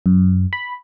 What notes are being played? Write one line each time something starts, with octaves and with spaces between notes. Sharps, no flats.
F#2
B5